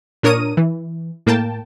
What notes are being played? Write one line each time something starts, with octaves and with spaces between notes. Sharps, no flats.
A#2 D4 A#4 C#5 D#6 D#7
E3
A2 A#3 G5 A5